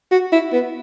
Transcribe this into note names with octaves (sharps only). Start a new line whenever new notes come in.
F#4
E4
B3